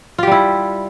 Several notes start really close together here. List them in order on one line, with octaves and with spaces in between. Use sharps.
F4 G4 G3 E4